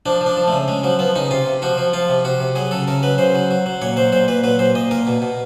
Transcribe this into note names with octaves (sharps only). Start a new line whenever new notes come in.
F3 D4
F3
D4
F3
A3
C#3
C#3 G#3
F3 F#3
F3 B3
C#3 D#4
C3 F4
C3
F3 F#4
F3
F3 F4
C3
C3 F#4
C3
F#3 G#4
C#3 A4
C#3 A#4
F#3 B4
C#3 C5
F#3
F#3
F#3
A#2 C#5
F#3 C5
A#2 C5
A#2 B4
F#3 B4
A#2 C5
A#2 D#5
A#2 A#4
B2
B2